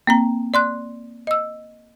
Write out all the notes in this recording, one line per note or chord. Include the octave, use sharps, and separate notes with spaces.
A#3 C4 A#5
D5 C6 F#6
D#5 E6